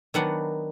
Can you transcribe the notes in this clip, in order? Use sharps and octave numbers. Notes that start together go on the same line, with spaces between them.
D#3 F#3 B3 D4 F#5